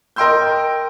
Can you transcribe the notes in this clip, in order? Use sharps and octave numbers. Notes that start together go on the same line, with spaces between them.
A#4 D#5 G5 C6 E6 G6